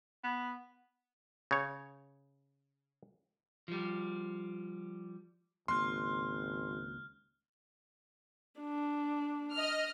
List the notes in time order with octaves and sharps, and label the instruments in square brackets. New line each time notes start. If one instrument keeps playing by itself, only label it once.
[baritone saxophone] B3
[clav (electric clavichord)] C#3 C#5
[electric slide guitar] F3 G3
[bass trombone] G#1 [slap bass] C#2 A#3 [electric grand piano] C6 [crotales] F6 F#6
[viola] D4
[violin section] D#5 F6